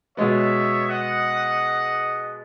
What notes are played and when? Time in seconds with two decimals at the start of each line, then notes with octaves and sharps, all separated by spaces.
0.17 B2 G#3 B3 C#5 E5
0.88 D#5 F#5